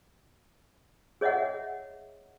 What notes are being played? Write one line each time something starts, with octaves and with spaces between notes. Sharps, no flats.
G#4 C#5 D#5 E5 F#5